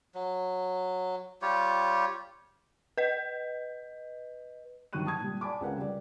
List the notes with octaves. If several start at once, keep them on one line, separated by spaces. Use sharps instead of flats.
F#3
G3 F4 G4 C#5
B4 D#5
G2 D#3 F#3 C#6 F#6 D#7
A5 D#6 G#6
A#2 G3
D5 G#5 A5 B5 D6
C#2 C#3 A#4 B4 F#5
G3 D5